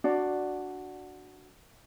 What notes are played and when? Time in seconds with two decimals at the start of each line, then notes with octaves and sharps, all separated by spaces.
0.04 D4 F#4 D5